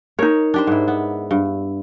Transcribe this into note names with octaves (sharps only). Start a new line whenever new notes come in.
D#4 A#4 C#5
D4 G4 C5
G#2 E4
B3
G2